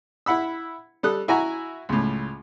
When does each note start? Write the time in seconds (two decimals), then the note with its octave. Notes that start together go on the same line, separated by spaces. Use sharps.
0.26 E4 F#5 B5 E6
1.03 G3 A4 D#6 F#6
1.28 E4 F#4 G#5 A#5
1.89 C#2 A2